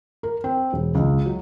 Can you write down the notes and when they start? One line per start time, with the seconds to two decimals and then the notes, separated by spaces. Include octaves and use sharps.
0.23 A#4
0.44 C4
0.73 E1
0.95 C#2
1.25 F#3